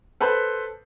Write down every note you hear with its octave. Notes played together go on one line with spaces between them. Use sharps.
A4 B4 C5 B5